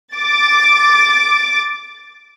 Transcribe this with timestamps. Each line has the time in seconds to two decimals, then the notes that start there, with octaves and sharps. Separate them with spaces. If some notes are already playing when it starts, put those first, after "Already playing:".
0.15 D6 A6